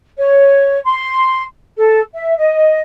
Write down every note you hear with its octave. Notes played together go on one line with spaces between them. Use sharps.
C#5
C6
A4
E5
D#5